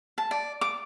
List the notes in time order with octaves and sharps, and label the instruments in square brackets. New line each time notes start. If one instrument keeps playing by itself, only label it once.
[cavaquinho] A5
D5
D6